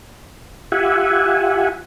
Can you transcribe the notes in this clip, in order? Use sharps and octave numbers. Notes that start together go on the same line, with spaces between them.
F4 G4 E5 F#5 G#5